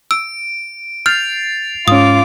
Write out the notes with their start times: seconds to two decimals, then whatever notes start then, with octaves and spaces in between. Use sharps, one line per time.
0.11 E6 D7
1.06 F6 G6 A6 C7 F7
1.88 G#2 C#4 F4 D6 D#6